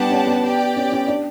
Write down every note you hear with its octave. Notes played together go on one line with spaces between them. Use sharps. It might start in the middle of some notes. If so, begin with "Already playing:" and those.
Already playing: G3 B3 D4 G4 D5 F#5 A5
C#4
B3
G4 D5 G5
C#4
C#4
D4